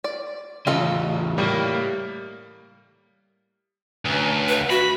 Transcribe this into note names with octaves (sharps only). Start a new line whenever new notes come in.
D5
E2 C#3 F4 A4 D#5
A2 G3 A#3
D2 C#4 A#4 B4
F4 A4 B4 E5
F#4 B4 B5